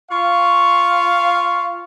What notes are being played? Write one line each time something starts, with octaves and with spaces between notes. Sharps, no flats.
F4 F5 C#6